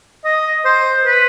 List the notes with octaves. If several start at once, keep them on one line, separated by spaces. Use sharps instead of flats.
D#5
C5
B4